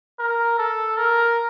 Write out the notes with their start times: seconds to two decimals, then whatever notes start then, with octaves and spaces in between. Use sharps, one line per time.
0.19 A#4
0.58 A4
0.97 A#4